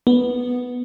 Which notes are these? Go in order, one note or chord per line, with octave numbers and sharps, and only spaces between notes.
B3